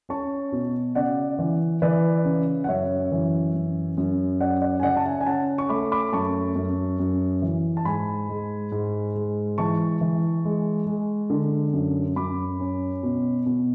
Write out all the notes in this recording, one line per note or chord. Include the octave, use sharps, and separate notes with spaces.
C#4 A5 C#6
B2
C#3 D5 F#5
E3
E3 B4 D5
C#3
F#5
F#2 C#5 E5
E3
F#2
F#2
C#4 D5 F#5
D5 F#5
G#5
C#3 D5 F#5
A5
E5 G#5
G#5
C#4 F#5 A5
C#6
A3 B5 D6
B5 D6
F#2 A5 C#6
F#2
F#2
E3
A5
G#2 G#5 B5
G#3
G#2
G#3
E3 A5 C#6
E3
G#3
G#3
D3
F#2
F#2 B5 D6
C#4
B2
B2